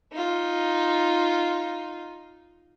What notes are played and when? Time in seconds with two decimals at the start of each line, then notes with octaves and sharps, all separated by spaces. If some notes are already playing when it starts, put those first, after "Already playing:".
0.12 D#4 F4